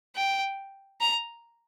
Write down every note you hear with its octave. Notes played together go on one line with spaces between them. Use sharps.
G5
A#5